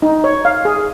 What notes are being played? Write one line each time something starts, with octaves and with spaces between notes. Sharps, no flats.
D#4
C#5
F5
G#4